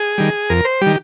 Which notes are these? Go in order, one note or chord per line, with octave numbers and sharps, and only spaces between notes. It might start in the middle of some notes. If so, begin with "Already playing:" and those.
Already playing: G#4
D#3 G3
F2 A#4
C5
D#3 G3 G4